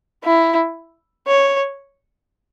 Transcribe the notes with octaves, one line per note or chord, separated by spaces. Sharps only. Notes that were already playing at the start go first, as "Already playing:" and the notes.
E4
C#5